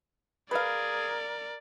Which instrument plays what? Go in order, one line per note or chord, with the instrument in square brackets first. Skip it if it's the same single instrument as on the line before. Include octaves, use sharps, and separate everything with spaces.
[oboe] G#4 [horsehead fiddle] A#4 [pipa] B4 F5 [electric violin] D5